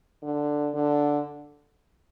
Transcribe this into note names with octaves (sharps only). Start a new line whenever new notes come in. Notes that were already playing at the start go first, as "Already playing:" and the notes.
D3
D3